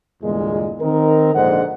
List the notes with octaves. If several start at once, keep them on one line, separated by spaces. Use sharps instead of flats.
G1 E2 A#2 G#3
D#3 C4 D#4 A#4
A#1 G#2 D3 C5 D#5 F#5